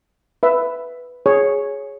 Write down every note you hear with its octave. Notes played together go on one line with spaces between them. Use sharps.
B4 E5
G#4 C#5